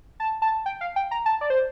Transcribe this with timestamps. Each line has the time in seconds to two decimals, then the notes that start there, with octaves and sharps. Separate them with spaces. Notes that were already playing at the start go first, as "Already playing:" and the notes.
0.20 A5
0.42 A5
0.66 G5
0.81 F5
0.96 G5
1.11 A#5
1.26 A5
1.41 D5
1.50 C5